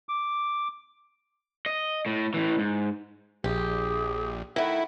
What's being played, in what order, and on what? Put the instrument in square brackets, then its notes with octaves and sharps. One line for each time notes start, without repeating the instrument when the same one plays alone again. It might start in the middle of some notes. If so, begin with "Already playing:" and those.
[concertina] D6
[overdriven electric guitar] D#5
A2
A2 E3
G#2
[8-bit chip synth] A#1 [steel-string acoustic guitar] G4 [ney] G#4
[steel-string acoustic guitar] D#3 A3 [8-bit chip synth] E4 [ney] F#5